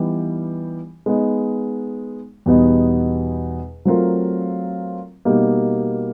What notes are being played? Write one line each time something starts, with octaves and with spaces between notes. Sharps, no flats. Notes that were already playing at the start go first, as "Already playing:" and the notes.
Already playing: E3 G3 B3 D#4 G4
G#3 B3 D#4
E2 B2 G3 B3 D#4
F#3 A3 C4 F4 A#4
B2 G3 A#3 D#4